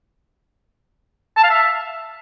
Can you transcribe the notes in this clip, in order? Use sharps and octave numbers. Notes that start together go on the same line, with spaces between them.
A5
F5
E5